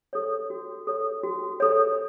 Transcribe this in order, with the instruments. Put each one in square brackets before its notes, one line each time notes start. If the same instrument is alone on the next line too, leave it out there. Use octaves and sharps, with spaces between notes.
[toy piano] A4 C#5
F#4
A4 C#5
F#4
A4 C#5